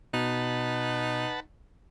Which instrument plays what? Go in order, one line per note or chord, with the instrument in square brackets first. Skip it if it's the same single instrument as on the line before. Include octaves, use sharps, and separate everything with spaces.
[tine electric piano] B2 [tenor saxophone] D#4 [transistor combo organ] B4 F#5 A5